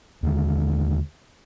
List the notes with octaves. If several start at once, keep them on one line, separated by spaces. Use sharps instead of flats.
D#2 D3 G3 G#3